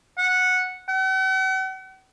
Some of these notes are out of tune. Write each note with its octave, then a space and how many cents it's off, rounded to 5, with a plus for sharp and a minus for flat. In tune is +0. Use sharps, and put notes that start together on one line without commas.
F#5 -10
F#5 +45